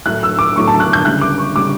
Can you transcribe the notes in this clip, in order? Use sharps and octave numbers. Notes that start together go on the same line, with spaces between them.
A2 F#3 A3 F#6
E6
D6
A2 F#3 A3 C#6
A5
F#6
G6
D2 C#3 G3 F#6
D6
C#6
C#3 G3 D6